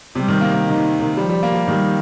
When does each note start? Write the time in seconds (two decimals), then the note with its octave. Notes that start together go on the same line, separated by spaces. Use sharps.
0.15 C3 G3
0.29 D#3
0.41 A#3
0.54 A#3
0.67 D#3
1.17 F3 G3
1.30 G3
1.43 A#3
1.55 G3
1.67 D#3 G3